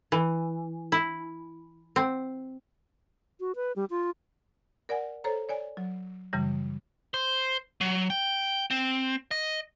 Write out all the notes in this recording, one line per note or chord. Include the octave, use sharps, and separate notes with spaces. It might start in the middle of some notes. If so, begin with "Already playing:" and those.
E3
E4
C4
F#4
B4
G3
F4
A#4 D5 F#5 G#5
A4 C5 C#5 A#5
C#5 D5 G#5
F#3
F#2 C#3 E3 G3
C5
F#3
G5
C4
D#5